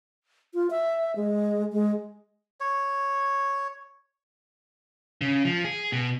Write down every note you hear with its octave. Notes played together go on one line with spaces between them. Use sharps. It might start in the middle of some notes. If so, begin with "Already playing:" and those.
F4
E5
G#3
G#3
C#5
C#3
F3
G#4
B2